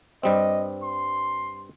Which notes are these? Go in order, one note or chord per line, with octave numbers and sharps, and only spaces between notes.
G2 G3 C4 D#5
C6